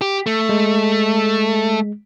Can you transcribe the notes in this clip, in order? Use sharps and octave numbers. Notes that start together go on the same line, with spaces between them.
G4
A3
G#3